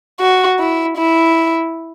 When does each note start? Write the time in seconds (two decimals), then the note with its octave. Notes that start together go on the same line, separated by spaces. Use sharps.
0.20 F#4
0.59 E4
0.97 E4